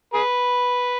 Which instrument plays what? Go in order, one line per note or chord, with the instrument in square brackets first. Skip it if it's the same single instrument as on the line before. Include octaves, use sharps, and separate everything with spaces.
[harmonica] G#4 B4